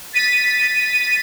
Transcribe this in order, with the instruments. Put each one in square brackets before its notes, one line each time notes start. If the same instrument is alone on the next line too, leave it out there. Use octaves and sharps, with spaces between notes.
[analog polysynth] A6 B6 D#7